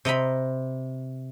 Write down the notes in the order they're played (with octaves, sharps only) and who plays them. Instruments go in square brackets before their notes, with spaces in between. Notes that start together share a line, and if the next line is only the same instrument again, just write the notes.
[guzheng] C3 D#5 A#5 B5